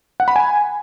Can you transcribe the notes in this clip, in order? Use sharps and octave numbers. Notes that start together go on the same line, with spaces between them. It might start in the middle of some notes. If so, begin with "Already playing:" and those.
F#5
B5
G#5